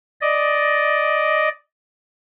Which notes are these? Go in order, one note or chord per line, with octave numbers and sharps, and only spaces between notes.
D5 D#5